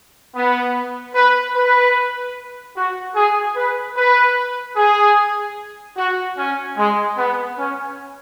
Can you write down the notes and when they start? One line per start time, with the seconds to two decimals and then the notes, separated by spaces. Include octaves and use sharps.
0.35 B3
1.15 B4
1.56 B4
2.76 F#4
3.15 G#4
3.56 B4
3.97 B4
4.76 G#4
5.97 F#4
6.37 C#4
6.77 G#3
7.17 B3
7.58 C#4